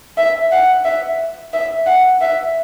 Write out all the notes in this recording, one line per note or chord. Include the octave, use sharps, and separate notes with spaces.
E5
F#5
E5
E5
F#5
E5